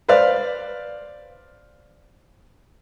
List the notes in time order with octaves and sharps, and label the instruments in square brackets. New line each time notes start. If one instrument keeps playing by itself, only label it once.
[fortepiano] B4 C5 D5 F5